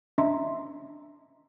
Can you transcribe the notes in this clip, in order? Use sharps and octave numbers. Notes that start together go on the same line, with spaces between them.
C#4 D4 D#5 E5 A#5 C6